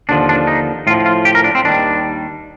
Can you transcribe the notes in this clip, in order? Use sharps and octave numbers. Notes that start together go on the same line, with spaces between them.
D#2 D3 F3 D4
D4
D#4
A2 F3 F4
F4
G4
A#4
D4
C4
D#2 D#3 G3 D4